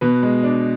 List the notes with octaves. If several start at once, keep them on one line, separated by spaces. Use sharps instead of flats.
B2 B4
G#3
D4